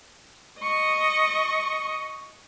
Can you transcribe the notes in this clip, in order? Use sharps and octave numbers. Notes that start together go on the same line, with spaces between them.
D#5 C#6